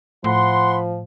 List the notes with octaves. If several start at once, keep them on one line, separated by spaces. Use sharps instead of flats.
A2 F3 F#5 B5 C6